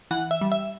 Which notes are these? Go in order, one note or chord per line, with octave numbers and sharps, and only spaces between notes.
E3 F#5
E5
G3
E5